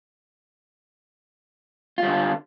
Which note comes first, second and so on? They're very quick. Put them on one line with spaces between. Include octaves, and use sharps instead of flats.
F4 G3 D3